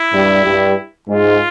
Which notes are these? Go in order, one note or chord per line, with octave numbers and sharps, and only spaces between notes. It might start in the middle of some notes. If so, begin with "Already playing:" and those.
Already playing: E4
G2 G3
G2 G3
G#2 G#3 F4